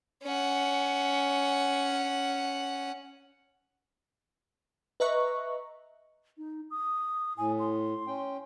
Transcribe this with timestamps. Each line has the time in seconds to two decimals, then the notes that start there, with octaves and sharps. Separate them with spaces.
0.24 C#4 F#5
5.00 B4 D#5 E5 A#5 C#6 F#6
6.38 D#4
6.71 D#6
7.38 A2 G#5
7.59 C6
8.07 C#4 G5